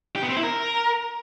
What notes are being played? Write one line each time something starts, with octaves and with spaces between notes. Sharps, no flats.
G4
B3
C4
E4
A#4